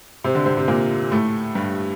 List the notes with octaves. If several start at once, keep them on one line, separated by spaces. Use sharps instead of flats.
C3 C4
D3 D4
C3 C4
C3 C4
A#2 A#3
A2 A3
G2 G3